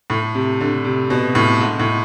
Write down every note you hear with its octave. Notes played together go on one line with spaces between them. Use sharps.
A2
C3
D3
C3
B2
A2
G#2
A2